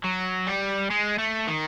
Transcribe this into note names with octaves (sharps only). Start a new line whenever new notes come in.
F#3
G3
G#3
A3
D#3